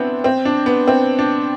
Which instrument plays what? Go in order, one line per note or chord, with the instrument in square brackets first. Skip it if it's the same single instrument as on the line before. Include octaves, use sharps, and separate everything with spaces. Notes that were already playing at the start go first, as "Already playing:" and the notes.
Already playing: [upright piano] B3 C4 D4 E4
C4
D4
B3
C4
D4